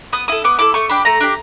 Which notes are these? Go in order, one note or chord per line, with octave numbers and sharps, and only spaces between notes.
B3 D#6
E4 A4 D#6
B3 D6
E4 A4 D6
A3 C#6
D4 G4 B5
A3 A#5
D4 G4